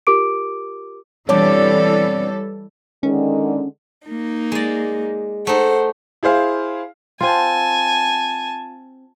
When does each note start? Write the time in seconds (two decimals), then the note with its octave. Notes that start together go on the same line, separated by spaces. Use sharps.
0.07 F4 G4 A#4 D6 D7
1.29 B2 E3 G3 C4 D4 A4 C#5 D6
3.03 D3 D#3 G#3 C#4
4.08 A#3 D#4
4.52 G#3 D5
5.47 A3 D#4 C5 F#5
6.23 E4 G#4 C5 F5
7.20 C4 F4 G#5 A5